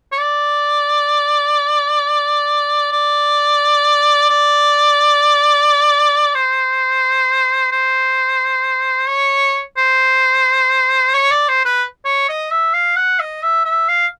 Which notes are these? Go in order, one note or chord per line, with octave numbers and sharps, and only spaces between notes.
C#5
D5
D5
D5
C5
C5
C#5
C5
C#5
D5
C5
B4
C#5
D#5
E5
F5
F#5
D#5
E5
E5
F5